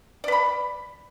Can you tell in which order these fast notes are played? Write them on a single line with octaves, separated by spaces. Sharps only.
D5 B4 B5